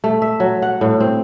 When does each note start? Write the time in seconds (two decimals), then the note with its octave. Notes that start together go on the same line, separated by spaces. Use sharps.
0.04 A3
0.22 E5
0.40 F#3
0.62 F#5
0.81 A2
1.00 C4